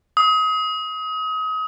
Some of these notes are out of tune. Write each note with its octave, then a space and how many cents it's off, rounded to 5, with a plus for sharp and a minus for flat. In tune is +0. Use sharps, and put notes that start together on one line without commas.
D#6 +30